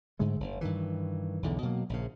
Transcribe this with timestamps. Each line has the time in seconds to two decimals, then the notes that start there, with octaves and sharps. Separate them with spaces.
0.19 G#2 D3 G#3 A3
0.40 F#1
0.61 G2 D#3 E3
1.42 B1 E2 D3
1.63 B2 F#3 A#3
1.90 A#1 C#3